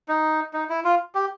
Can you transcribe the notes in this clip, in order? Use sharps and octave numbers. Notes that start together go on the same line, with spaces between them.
D#4
D#4
E4
F4
G4